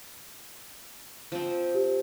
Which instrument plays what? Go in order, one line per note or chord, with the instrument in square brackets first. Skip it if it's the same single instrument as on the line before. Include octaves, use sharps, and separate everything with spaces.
[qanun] F3 C4
[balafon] G4